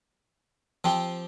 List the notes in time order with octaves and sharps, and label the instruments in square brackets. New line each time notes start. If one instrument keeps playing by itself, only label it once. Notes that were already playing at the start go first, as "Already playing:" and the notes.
[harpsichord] F3 C4 G4